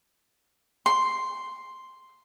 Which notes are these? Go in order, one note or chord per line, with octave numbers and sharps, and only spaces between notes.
C6